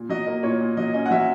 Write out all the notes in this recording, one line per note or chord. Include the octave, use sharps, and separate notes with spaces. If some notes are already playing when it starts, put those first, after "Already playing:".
Already playing: A#2
F#3 D#5
A#3 D#5
A#2 C#5
A#2
F#3 D#5
C#4 D#5
F#5
F#3 E5